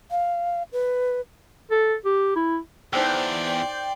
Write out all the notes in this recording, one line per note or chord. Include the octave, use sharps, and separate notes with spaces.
F5
B4
A4
G4
E4
E2 D#4 C5 D5 G5 C6 E6